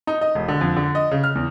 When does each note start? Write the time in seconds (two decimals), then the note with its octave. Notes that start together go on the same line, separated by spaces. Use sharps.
0.07 D#4
0.21 D#5
0.35 E1
0.48 D3
0.61 F2
0.77 D3
0.95 D#5
1.11 C#3
1.24 F6
1.35 E2